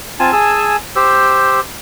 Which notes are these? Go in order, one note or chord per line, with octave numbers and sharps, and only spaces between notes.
C4 F4 G#5 A5
G#4 G#5 A5 E6
G4 C5 E6